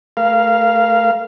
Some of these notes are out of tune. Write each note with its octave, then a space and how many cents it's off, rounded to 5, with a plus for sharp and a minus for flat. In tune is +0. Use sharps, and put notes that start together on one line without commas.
A3 +0 A#4 +25 F5 -15